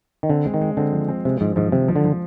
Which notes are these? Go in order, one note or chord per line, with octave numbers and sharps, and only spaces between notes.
D#3
D3 C4
G#3
D#3
G#3
D3 C4
F3
C4
C3 G#3
G#2 F3
G#2 F3
C3 F3
F3
D3
F3